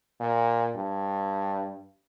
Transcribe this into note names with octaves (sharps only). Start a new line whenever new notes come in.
A#2
G2